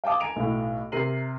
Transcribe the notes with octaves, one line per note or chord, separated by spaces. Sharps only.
F5 G5 A5 D6 D#6
G#5 A#5 D7 F7
B1 A2
C3 A#4 C7 D#7 F#7